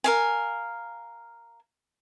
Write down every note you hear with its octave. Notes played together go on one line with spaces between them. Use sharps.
A#4 F5 G#5